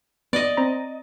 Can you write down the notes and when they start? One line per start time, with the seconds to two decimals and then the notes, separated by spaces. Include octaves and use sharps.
0.33 B3 D5 D#5
0.57 C4 A#5